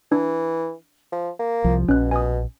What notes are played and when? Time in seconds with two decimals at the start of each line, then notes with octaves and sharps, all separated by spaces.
0.12 E3 D4
1.12 F3
1.39 A#3
1.64 C2 F3
1.89 A#1 B2 C#4 F#6
2.11 B2 G#5 D#6